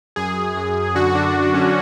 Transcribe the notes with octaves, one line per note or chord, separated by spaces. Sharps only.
F#2 G#4
F#2
F#2
F#2
D3 F#4
D3 D4
D3 D4
D3 C#4